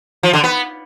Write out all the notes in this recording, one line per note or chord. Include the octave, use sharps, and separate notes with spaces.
F3
D3
B3